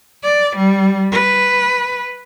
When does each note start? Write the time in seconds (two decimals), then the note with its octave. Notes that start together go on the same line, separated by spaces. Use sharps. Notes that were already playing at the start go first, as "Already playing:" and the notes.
0.24 D5
0.56 G3
1.12 B4